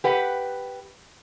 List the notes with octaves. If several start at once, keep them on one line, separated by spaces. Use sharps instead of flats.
G4 B4 F#5